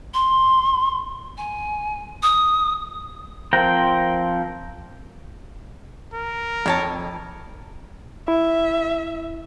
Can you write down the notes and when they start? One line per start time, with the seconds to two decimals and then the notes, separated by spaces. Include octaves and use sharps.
0.14 C6
1.37 G#5
2.23 D#6
3.53 F3 C4 A#4 G5
6.14 A#4
6.66 F2 D#3 C#5 A5
8.28 E4 E5